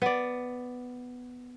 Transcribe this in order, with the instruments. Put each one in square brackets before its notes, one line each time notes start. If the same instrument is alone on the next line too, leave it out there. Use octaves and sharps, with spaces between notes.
[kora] B3 D5